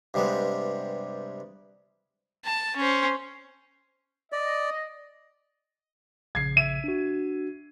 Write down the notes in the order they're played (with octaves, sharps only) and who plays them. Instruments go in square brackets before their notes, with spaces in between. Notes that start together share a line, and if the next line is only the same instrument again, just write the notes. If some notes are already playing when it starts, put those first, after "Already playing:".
[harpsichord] G2 C3 G3 G#3 B3
[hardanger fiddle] A5
C#4 C5
[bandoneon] D5 [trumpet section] D#5
[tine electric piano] A#1 C#3 [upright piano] G#6 C7
[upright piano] E5 D#7
[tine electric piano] D4 F#4